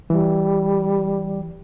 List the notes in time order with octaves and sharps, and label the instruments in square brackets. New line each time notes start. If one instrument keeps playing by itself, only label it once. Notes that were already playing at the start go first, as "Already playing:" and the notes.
[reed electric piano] E3 [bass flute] G3